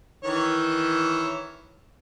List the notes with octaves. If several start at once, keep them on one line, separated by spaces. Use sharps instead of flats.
D#3 E3 C#5